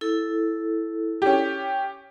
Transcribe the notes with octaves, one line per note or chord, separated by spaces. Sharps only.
E4 A4
C#4 G4